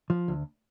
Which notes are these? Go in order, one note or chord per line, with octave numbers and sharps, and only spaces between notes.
F3
D2